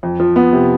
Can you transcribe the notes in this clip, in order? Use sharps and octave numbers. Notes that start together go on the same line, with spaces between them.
F2
F3
B3
C3